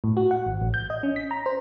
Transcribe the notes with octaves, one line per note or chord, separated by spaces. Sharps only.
A2
F#4
F#5
G#1
A1
G6
D#5
C#4
B6
A#5
C5